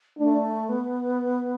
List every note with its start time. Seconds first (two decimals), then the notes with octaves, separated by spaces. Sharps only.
0.18 A3 D4
0.69 B3